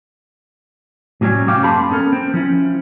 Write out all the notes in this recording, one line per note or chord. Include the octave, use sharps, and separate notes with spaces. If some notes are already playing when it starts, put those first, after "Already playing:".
A2 C3 F#3 G3 C#4
G#2 C3 F#3 C#4 G4 F5
F#2 A#3 G#4 A5 B5 C6
B3 C#4 A4 A#4
C4
F3 C#4 E4